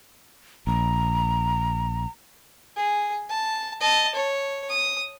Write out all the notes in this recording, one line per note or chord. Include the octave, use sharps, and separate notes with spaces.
A#1 A#5
G#4
A5
D#5 A5
C#5
D#6